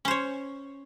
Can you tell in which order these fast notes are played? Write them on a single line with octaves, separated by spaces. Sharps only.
C#4 C5 C#5